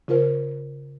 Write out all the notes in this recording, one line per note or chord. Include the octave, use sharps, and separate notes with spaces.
C#3 F4 A#4 C5